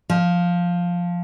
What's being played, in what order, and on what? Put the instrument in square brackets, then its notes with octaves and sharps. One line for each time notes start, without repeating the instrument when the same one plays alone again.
[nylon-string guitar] F3